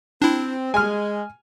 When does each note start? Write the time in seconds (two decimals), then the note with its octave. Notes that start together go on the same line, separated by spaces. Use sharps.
0.22 C4 D4 E4
0.74 G#3 G#5 F6